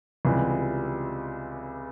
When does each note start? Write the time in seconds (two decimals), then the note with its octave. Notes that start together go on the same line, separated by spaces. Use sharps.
0.25 C#2 C3 E3 G3